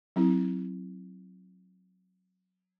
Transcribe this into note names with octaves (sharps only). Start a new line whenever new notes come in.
F#3 C4 E4